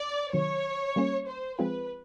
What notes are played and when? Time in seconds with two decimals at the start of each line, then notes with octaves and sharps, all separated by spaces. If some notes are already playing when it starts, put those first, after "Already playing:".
Already playing: D5
0.33 C3 D#3 F#3 C#5
0.96 G3 A#3 C#4
1.27 C5
1.59 F3 G#3 C4 F4 G#4 B4